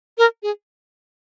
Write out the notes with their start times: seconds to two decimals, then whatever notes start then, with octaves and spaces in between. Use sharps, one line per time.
0.18 A#4
0.43 G#4